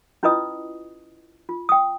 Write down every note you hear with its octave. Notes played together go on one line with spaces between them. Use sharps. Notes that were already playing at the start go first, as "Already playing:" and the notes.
C#4 E4 F4 B4 D#5 D#6
F4
G5 D#6